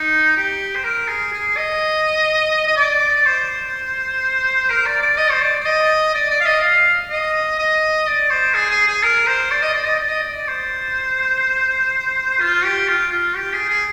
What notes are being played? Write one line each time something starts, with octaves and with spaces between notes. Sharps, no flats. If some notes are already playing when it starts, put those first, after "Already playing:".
Already playing: D#4
G4
C5
A#4
G#4
G#4
D#5
D#5
D5
C5
A#4
D5
D5
D#5
C5
D5
D5
D#5
D5
D5
F5
D#5
F5
D#5
D#5
D5
C5
G#4
G#4
G#4
A#4
C5
D5
D#5
D5
D#5
D5
D#5
D5
C5
F4
G4
F4
F4
G4
G#4
G#4